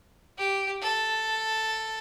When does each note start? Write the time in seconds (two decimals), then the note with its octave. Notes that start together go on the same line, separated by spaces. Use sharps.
0.38 G4
0.82 A4